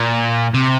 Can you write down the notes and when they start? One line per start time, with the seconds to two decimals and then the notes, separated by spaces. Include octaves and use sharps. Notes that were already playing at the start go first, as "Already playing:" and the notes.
Already playing: A#2
0.54 C3